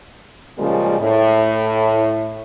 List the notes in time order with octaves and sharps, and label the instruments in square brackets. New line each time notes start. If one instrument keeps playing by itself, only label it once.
[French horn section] A#2 C#3 F3 G3 G#3 A#3
A2